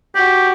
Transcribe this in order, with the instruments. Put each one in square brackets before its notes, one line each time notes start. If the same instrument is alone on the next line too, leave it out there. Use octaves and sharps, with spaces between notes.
[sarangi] F#4 [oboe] G4